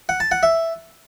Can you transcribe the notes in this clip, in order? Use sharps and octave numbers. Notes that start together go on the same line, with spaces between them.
F#5
A5
F#5
E5